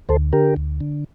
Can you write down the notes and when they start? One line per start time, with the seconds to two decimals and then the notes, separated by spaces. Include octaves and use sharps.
0.09 D2 A4 C5
0.33 D3 G4 A#4
0.56 D2
0.81 D3